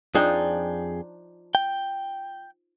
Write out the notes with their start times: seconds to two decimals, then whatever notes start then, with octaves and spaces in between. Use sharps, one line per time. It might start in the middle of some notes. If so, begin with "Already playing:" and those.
0.15 F2 F3 D4 D#4 G#4 G5
1.55 G5